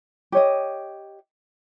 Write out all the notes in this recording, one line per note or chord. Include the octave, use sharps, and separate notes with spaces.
G4 C#5 D#5